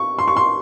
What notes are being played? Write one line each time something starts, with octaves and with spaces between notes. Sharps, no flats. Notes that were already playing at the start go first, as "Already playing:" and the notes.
Already playing: C#6
C6
C#6
C6